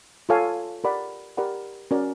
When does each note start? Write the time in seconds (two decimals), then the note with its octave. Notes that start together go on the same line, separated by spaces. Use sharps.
0.29 F4 A4 C#5 F5 G#5
0.84 G4 A#4 D5 F#5 B5
1.37 G4 A#4 D5 F#5 B5
1.91 C#4 F#4 A#4 D5